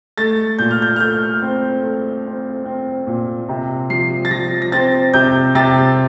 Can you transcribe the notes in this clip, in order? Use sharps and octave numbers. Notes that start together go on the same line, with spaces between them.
A3 A6
A#2 G6
F6
G6
F6
A3 G6
C4
A3
C4
C4
A#2
C3
F3 C7
A6
F3 A#6
A#6
C4 A6
C3 G6
C3 A6